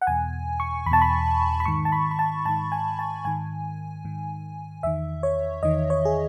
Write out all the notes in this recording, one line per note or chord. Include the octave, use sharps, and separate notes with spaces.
F#5
E2 B2 G#5
C#6
E2 B5
B2 A5
B5
B5
G#2 D#3 C#6
A5
B5
B5
A5
G#2 D#3 A5
G#5
A5
G#2 D#3 G#5
G#2 D#3
E2 D#3 E5
C#5
E2 D#3 D#5
C#5
G#4